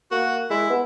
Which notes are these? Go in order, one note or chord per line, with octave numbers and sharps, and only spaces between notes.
A#3 F#4
G#3 E4
B3